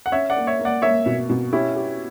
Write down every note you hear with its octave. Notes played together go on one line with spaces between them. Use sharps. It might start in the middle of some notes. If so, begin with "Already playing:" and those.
F#5
C#4 C#5 E5
D5 F#5
A#3
C#5 E5
A#3
D5 F#5
A#3 C#5 E5
B2
B2
C#4 E4 G4
G4